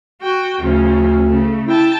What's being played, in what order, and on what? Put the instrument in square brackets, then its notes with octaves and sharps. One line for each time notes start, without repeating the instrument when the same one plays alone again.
[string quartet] F#4 G5
[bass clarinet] D2 [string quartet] C#3 F3 C#4
[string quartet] C#3 A3
[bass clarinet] E4 [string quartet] G5 A5